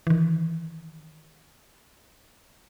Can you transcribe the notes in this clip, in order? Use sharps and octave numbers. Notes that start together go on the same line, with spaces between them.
D#3 E3